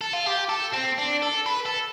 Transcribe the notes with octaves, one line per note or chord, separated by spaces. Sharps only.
A4
F4
G4
A4
C4
D4
A4
B4
A4